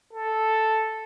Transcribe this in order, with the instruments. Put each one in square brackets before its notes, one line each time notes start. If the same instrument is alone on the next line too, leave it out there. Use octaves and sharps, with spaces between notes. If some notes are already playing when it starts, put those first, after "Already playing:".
[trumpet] A4